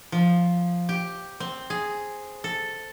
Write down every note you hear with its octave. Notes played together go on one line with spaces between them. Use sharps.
F3
G4
C4
G#4
A4